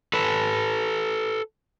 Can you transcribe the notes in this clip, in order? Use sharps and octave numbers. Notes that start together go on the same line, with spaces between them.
A4 B4